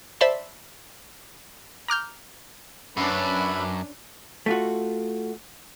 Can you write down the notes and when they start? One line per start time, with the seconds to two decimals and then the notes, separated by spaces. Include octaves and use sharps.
0.21 C5 D5 E5 A5 B5 C6
1.88 A#5 D6 F6 G6
2.97 F#2 C#4 D4 B4 E5 B5
4.46 A3 F4 F#4